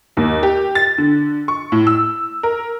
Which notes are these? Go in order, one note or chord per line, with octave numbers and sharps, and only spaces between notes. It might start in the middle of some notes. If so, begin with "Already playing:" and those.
D#2
G4
A6
D3
C#6
A2
E6
A#4